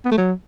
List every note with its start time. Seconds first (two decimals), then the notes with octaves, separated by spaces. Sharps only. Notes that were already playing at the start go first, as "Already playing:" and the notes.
0.05 B3
0.12 A3
0.18 F#3